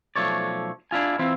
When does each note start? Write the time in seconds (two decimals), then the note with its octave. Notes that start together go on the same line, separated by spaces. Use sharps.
0.16 B1 F3 A3 C#5 D5
0.91 D4 E4 F4 G#5
1.19 E3 C4 E4 F4 E5